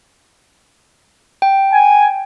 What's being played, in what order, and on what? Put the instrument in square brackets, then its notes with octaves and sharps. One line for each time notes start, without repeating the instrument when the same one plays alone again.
[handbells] G5
[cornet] G#5